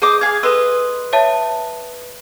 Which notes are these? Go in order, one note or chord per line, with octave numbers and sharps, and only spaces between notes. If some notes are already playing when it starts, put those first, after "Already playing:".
G#4 C5 D#5 D6
G#4 F5 G#6
A4 B4 D#5 C6 E6
C#5 E5 A5